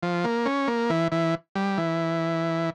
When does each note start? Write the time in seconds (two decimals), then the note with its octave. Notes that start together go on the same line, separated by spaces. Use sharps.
0.03 F3
0.24 A#3
0.46 C#4
0.68 A#3
0.90 E3
1.12 E3
1.55 G3
1.78 E3